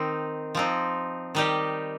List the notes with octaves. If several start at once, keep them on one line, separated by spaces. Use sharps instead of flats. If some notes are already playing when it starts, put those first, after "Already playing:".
Already playing: D#3 C4 D#4
F3 C4 D#4
D#3 G3 D#4 G4